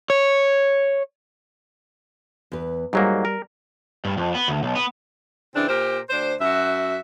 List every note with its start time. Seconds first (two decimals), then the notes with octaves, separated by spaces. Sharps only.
0.10 C#5
2.52 E2 B4
2.93 G#2 F#3 G3 A#3
3.25 A#4
4.05 G2
4.18 F2
4.35 B3
4.48 D2
4.63 B1
4.75 B3
5.54 C#3 E3 C4 D4
5.68 A#2 G4 A#4 C5
6.10 D2 D4 C5
6.41 F#2 F#4 E5